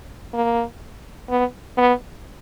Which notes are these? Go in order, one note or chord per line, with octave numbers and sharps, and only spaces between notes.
A#3
B3
B3